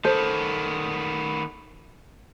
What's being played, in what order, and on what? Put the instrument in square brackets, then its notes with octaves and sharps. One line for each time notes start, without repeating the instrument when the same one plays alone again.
[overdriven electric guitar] D#3 B3 [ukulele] A4 C5